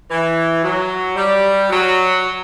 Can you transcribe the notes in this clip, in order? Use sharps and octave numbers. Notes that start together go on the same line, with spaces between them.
E3
F#3
G3
F#3